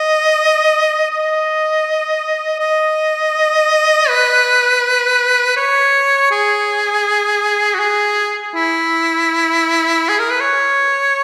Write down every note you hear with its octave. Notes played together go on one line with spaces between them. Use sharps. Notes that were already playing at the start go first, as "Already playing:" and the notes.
Already playing: D#5
D#5
D#5
B4
C#5
G#4
F#4
G#4
E4
G#4
A#4
B4
C#5